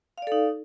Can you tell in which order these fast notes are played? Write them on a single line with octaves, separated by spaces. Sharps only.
F5 D5 A4 D#4